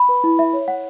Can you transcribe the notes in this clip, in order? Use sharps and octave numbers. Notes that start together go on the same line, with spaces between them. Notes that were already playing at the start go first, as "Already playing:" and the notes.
Already playing: B5
B4
E4
E5
C#5
F#5